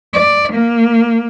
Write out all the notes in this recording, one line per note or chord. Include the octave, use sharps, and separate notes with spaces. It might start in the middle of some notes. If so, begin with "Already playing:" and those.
D5
A#3